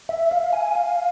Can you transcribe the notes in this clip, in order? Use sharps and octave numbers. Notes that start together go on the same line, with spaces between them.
E5
F5
G#5
F5